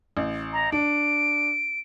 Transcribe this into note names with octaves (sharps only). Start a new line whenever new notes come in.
A1
A#5
D4 D7